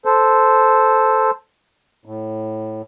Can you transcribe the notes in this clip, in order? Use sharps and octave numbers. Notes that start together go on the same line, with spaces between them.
A4 C5
A2